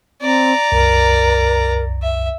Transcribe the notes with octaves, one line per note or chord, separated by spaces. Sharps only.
C4 D5 A#5
C2 F#2 A#4
E5